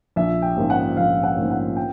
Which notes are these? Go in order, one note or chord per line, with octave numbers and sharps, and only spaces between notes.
A#1 E5
G5
G#2 F3 A#3 C#4
F#5
A#1 F5
F#5
G#2 F3 A#3 C#4
F#5
G5